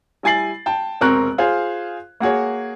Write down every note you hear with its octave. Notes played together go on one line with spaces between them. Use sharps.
G3 E4 G#5 A6 C7 F#7
G5 A5
E1 C3 C4 A#4 C#6 F#6
F4 G#4 C5 F5
A#3 F#4 G#4 C#5